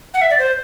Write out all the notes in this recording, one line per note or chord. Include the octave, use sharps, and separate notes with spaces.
F#5
E5
D5
C5